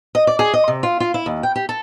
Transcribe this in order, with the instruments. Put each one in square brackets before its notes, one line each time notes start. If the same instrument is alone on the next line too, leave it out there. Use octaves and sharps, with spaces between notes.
[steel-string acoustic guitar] D#5
D5
G#4
D#5
C3
F4
F4
E4
D#2
G5
G4
A4